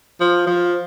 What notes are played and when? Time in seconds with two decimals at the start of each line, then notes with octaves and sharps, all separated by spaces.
0.20 F3
0.47 F3